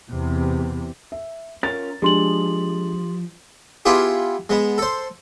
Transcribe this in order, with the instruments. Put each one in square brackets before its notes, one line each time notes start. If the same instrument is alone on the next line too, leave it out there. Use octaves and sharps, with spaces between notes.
[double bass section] E2 C3
[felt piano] E5
[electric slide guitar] C#4 F4 A#4 [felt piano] A6
[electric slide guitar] F3 [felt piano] G#3 D4 [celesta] G4 C6 F#7
[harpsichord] B3 E4 F4 G4 G#4
G#3 B3
A4 C5